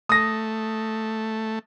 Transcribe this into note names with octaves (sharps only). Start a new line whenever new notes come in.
A3 D#6 A#6